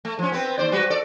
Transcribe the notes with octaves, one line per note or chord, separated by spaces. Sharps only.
A3
F3 C#4
B3 C4 B4
D#2 C5 D5
G3 F#4 B4
A4 D5